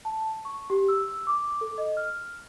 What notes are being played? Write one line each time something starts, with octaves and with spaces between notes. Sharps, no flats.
A5
C#6
G4
E6
D6
A4
D#5
F6